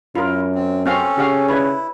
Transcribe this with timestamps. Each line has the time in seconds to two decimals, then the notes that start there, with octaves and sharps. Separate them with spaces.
0.15 F#2 E4 F4 A#4
0.55 C4
0.86 C4 C#4 F#4 A4 F5
1.18 C#3 F#4 G4 F5
1.48 D4 E4 B4 C#5